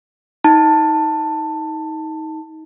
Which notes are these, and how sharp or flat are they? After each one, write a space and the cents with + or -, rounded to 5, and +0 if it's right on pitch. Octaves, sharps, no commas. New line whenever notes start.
D#4 +25 A5 +15